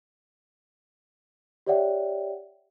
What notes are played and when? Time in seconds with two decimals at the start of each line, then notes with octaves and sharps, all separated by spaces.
1.66 G4 C#5 D5 E5 F#5 G5